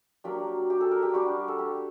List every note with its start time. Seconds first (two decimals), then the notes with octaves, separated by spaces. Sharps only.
0.24 F#3 A#3 D4 G4
0.70 G4
0.81 A4
0.91 A#4
1.02 G4
1.14 G3 D4 F#4
1.48 A4
1.59 G4